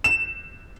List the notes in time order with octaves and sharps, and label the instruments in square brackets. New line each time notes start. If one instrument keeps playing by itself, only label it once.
[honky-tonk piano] E7